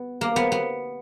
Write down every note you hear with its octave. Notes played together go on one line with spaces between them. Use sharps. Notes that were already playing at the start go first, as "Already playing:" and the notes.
Already playing: B3
A#3
B3
B3